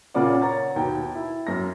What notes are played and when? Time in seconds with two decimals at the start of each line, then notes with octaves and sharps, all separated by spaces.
0.14 A#2 C#3 A#3 F4 D5 F#5
0.42 C#5 F#5 A#5 A6
0.76 D#2 B2 G5 A#5
1.15 E4
1.47 F#2 A#6